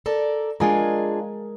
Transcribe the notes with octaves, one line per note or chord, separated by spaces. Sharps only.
A4 A#4 D5
G#3 D4 F4 G#4 A#4